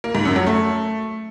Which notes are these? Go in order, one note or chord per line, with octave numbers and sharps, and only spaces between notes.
A#3
G#2
F#2
F#3
A3